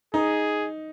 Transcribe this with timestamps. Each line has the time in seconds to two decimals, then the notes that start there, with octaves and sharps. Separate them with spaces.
0.14 D#4 G#4